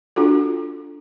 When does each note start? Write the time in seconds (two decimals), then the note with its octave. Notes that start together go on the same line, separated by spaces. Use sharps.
0.16 D4 F4 F#4 A4